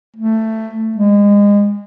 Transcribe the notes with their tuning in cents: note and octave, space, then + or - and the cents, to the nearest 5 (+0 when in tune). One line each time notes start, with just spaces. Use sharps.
A3 +10
G#3 -30